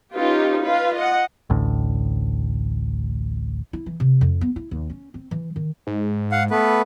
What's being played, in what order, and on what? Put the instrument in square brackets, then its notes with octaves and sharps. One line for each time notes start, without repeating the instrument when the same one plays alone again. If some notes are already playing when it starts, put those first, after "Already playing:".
[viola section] C#4 D#4 F4 G4 B4
F4 B4 F5
D#5 F#5
[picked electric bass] A1 D2 A2
[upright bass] E4
E3
C3
F2
B3
E4
D#2
C#4
C4
E3
D#3
[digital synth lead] G#2
[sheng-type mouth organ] F5 F#5
A3 B3 B4